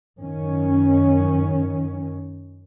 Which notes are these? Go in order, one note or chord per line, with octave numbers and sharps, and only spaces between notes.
F#2 D#3 C#4